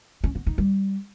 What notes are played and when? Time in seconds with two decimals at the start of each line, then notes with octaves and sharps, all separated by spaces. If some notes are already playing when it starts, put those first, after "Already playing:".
0.24 C#4
0.35 B3
0.47 D#4
0.58 G3